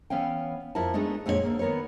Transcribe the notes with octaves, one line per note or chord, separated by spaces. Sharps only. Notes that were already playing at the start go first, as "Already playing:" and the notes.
E3 B3 C#4 F5 G5
F2 E4 F4 A#4 A5
G#3 A3 B3 D4 D#4
F2 A#2 G#3 D4 G4 C#5
D2 A#3
D#3 B3 A#4 B4 C#5